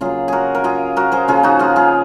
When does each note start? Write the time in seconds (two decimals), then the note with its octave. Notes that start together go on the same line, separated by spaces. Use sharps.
0.01 C#3 F#3 A#3 F4 G#4
0.28 F#4 G#4 A#4
0.55 A#4
0.64 F4 G#4
0.97 F#4 A#4
1.12 G#4 C5
1.28 C#3 F3 A#3 F4 G#4
1.43 D#4 F#4
1.59 F4 G#4
1.76 F4 G#4